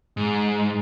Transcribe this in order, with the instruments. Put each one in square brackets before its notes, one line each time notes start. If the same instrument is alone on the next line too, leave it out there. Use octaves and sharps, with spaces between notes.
[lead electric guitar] G#2